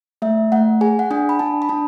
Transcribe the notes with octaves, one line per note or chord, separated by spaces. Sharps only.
A3 E5
A3 F#5
G#4 G#5
F#5
D4 G#5
B5
D4 A5
B5
D4 A5